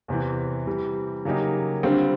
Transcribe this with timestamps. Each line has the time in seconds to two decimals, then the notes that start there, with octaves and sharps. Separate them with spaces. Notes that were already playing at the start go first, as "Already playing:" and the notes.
0.08 E2 C3 E3
0.67 C3 E3 G3
1.25 C#3 F#3 A#3 D#4 G4
1.83 D3 G3 C4 F4